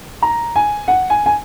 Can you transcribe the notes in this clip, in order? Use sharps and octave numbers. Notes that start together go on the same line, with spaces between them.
A#5
G#5
F#5
G#5
G#5